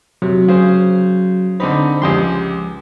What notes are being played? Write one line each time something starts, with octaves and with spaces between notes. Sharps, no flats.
C3 F#3
C#3 C5
D3 C4 D#4 C5 B5
C#2 F3 G4 C6